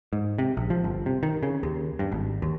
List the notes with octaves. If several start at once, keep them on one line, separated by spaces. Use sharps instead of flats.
G#2
C3
A#1
F3
G1
C3
D#3
C#3
D#2
G2
G#1
D#2